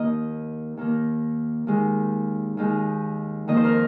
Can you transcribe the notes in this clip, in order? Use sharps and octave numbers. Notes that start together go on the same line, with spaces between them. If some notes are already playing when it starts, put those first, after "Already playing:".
Already playing: D#2 D#3 A#3 D#5
D#2 D#3 A#3
D#2 D#3 G#3
D#2 D#3 G#3
F2 D#3 A#3 D#5
C5
A#4